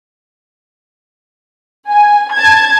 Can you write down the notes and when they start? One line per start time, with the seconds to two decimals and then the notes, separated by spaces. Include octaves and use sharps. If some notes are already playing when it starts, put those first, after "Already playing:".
1.89 G#5
2.34 A5 G#6